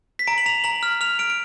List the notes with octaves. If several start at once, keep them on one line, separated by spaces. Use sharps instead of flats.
B6
A#5 D7
F#7
A#5 F7
A#5 F#7
F6
F6 F7
F6 D7
D7